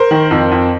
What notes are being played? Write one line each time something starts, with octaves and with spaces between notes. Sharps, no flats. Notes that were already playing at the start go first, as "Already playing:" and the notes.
Already playing: A#4 C5
D#3
F2
F2